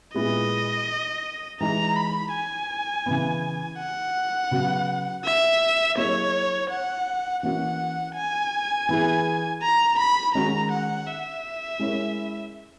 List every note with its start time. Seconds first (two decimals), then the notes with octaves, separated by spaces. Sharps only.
0.14 A#2 G#3 B3 E4 G#4 D#5
1.60 E3 G#3 D#4 A#5
1.96 B5
2.33 G#5
3.06 C#3 E3 B3
3.78 F#5
4.51 C#3 F#3 B3 F#4
5.25 E5
5.97 F#3 A#3 E4 G#4 C#5 D#5
6.70 F#5
7.43 E3 A#3 C#4 F#4 F#5
8.15 G#5
8.89 E3 B3 E4 G#4
9.62 A#5
9.98 B5
10.34 D#3 G#3 C#4 F#4 A#5
10.71 F#5
11.07 E5
11.79 G#3 C#4 E4 A#4 C#5